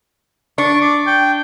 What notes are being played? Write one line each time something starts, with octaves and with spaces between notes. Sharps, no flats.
D4 C#6
D5
G5